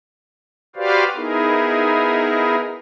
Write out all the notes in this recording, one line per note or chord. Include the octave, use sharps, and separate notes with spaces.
F#4 G4 B4 C5 D5 F5
B3 D#4 E4 G#4 A#4